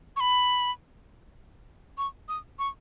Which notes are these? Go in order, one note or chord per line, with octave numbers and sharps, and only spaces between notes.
C#6
B5
C#6
D#6
C#6